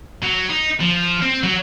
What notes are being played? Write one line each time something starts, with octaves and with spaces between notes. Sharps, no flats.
F#3
D#4
F3
C4
F#3